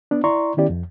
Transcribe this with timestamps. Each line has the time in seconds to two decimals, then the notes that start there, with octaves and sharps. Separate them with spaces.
0.11 B3 D4
0.24 E4 D5 A#5 C6 C#6
0.57 D#3 B3 C#4 E4 G4 D5
0.70 F2